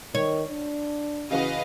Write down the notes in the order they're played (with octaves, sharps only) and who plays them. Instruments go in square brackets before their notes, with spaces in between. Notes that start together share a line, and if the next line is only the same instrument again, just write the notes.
[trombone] D#3 [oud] C#5
[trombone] D4
[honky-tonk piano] C#3 E3 F#4 [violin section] B4 D#5 F5